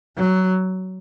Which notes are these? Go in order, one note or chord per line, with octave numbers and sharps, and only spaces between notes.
F#3